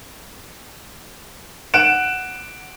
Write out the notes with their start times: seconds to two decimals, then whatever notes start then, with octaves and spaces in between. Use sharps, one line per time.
1.74 F#5 F#6 D7 E7